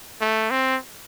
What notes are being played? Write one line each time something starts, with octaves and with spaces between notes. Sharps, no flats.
A3
C4